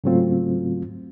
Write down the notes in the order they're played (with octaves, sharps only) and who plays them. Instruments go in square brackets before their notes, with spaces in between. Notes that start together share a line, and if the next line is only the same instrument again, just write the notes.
[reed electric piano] G#2 C#3 F#3 A3 C4 F4